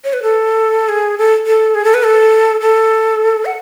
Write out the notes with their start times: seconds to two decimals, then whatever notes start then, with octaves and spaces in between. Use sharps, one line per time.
0.04 C#5
0.13 B4
0.23 A4
0.89 G#4
1.18 A4
1.47 A4
1.75 G#4
1.84 A4
1.94 B4
2.03 A4
2.61 A4
3.45 F#5